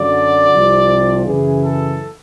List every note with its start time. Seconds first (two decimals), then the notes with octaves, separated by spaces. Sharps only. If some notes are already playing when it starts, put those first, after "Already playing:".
Already playing: F#2 D3 F#3 D5
0.50 C2 C3 F3
1.25 F#2 C#3 E3 G#4
1.61 A4